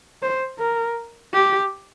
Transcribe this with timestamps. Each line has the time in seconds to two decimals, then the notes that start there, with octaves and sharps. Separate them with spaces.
0.22 C5
0.59 A#4
1.34 G4